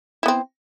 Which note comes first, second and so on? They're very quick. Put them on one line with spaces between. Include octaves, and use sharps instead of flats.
E4 B3 C4